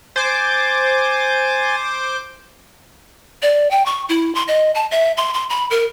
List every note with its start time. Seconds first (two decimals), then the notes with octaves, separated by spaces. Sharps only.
0.16 C5 G#5 D6 A6
3.42 D5
3.71 G5
3.86 C#6
4.09 E4
4.35 C6
4.48 D#5
4.75 A5
4.91 E5
5.17 C6
5.34 C6
5.50 B5
5.70 A#4